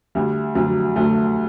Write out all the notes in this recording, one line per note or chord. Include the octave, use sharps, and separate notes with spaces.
D2 G3
D2 F#3
D2 F#3 A3